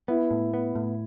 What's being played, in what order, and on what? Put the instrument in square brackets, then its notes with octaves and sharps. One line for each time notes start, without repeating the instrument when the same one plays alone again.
[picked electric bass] B3 [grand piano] E4
[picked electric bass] A2
B3
A2